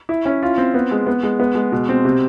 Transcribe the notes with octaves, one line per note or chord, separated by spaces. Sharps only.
E4
C#4
F4
C4
B3
G#3
B3
G#3
B3
G#3
B2
C4
C3